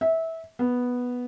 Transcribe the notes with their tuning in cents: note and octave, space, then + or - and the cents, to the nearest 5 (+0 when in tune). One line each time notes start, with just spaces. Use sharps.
E5 -20
B3 -5